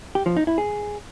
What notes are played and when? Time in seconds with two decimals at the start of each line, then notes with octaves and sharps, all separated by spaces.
0.15 G4
0.26 F3
0.37 D#4
0.47 E4
0.58 G#4